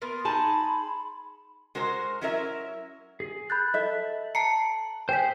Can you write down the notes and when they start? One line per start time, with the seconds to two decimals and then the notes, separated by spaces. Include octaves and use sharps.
0.02 B3 A#4 C6
0.25 D#4 G#4 A5 B5
1.75 G#3 F#4 A#4 C5
2.21 F#3 C#4 D4 E4 A#4 E5
3.20 G#4
3.50 B5 F#6 G6 A6
3.74 A4 D#5 E5
4.35 A5 A#5 C7 C#7
5.09 G#4 C5 G5 G#5 B6